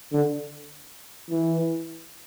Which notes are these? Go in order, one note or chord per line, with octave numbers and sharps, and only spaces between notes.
D3
E3